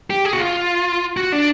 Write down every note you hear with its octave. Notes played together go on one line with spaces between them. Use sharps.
G4
G#4
F#4
F4
F#4
D4